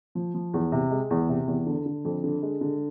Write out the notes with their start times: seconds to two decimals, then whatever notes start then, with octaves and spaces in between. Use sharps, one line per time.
0.15 F3
0.34 F3
0.54 E2
0.72 C3
0.91 G#3
1.10 E2
1.29 C3
1.47 E2
1.67 D3
1.86 D3
2.05 F2
2.24 D3
2.42 G#3
2.61 D3